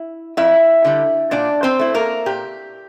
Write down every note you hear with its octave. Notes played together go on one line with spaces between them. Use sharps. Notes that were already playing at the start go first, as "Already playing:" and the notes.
Already playing: E4
F2 E4 E5
D3 G3
A#2 D4 D5
C4 C5
A3 E4
A#3 A#4
A#2 G4